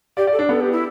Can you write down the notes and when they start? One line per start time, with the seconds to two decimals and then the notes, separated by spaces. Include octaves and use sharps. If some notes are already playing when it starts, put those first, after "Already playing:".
0.17 G4 D5
0.27 D5
0.32 A4
0.39 D4
0.49 B3 A4
0.61 G4
0.72 E4